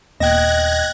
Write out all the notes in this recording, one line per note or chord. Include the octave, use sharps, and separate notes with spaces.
D#1 A#3 B3 D#5 G5 F#6 G#6 A#6